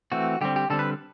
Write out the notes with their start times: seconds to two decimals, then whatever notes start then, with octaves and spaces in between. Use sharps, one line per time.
0.12 E3 A3 C4 F#4
0.41 D3 G3 C4 G4
0.56 G4
0.70 D3 G3 C4 A4
0.79 B4